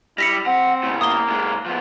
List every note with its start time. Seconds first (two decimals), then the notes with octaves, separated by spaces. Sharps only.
0.18 G3 E4 A#6 B6 C#7
0.46 C4 F#5
0.83 A2 C#3
1.01 A#3 D#6 G7
1.29 A#2 G#3
1.66 F3 B3